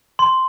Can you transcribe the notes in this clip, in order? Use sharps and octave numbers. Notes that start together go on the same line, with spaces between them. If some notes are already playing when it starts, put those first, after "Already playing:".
C6